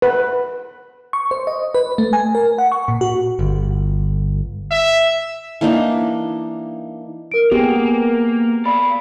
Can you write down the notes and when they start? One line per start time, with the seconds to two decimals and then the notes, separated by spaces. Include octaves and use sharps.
0.02 B4
1.13 C#6
1.31 C5
1.47 D#5
1.75 B4
1.98 A3
2.13 G#5
2.35 A#4
2.58 F#5
2.72 C#6
2.88 A#2
3.01 F#4
3.39 G1
4.71 E5
5.61 E3 A#3 D4 D#4
7.32 A#4 D7
7.51 A#3 B3 G4 G#4
8.66 D5 F5 B5